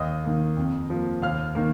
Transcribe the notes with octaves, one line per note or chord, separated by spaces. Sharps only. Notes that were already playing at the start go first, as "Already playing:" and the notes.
Already playing: D#2 D#5 D#6
D#3 A#3
F2
F3 A#3
D#2 F5 F6
D#3 A#3